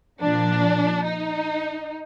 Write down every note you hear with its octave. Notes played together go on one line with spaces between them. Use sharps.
A#2 F3 D4
D#4